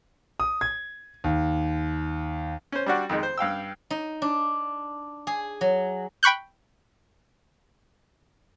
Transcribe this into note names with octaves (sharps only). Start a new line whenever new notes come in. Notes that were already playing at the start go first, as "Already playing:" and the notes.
D#6
G#6
D#2
C#4 C5
G3 D4 F#4
F2 D#3 G#3
C5
G2 F5 G5 E6
D#4
D4
G#4
F#3
G5 B5 C#6 F#6 G6